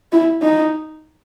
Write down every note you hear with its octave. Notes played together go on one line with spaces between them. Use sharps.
E4
D#4